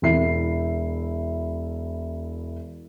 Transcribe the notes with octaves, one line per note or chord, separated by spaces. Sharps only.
E1 E4 C7